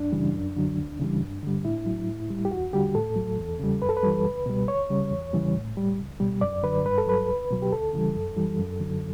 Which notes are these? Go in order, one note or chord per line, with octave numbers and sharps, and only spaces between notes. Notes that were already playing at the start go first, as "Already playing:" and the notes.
Already playing: F#2 D4
C#3 E3 G3
F#2
D3 F#3
D2
C#3 E3 G3
G2
D3 G3
A2 E4
F#3
A2
G3
G4
E2 F#4
D3 G3 G4
A2 A4
F#3
E2
C#3 G3
F#2 B4
A4
B4
E3 G3
C#2
B2 G3
D2 C#5
C#3 G3
E2
C#3 E3 G3
A2
G3
C#2
B2 G3
F#2 D5
D3 F#3 B4
G2 B4
A4
F#3 B4
C#2
B2 F#3
G4
D2 A4
C#3 E3 G3
F#2
E3 G3
F#2
D3 F#3